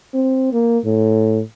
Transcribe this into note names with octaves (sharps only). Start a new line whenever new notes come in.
C4
A#3
A2